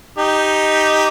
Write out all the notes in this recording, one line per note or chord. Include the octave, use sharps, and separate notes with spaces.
D#4 G4